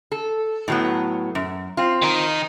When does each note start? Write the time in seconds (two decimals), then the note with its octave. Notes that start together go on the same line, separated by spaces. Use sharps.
0.12 A4
0.68 A2 F#3 B3
1.35 F#2
1.77 C4 F4
2.02 D#3 D#4